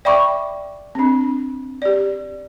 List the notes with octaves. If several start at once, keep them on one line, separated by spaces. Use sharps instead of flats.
D5 E5 G5 B5 C#6 D6
C4 D4
G4 D5